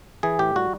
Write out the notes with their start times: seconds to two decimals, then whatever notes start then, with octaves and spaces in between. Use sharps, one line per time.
0.23 E3 G#4
0.39 A2 G4
0.56 G3 F#4